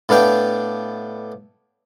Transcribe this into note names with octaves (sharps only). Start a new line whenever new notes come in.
A2 B3 D4 F5 G5